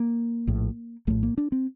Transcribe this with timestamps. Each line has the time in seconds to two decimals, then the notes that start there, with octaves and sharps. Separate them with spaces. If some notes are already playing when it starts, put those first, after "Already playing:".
Already playing: A#3
0.47 A#1 A2
1.07 A#1 A2 A3
1.23 A#3
1.38 D4
1.52 C4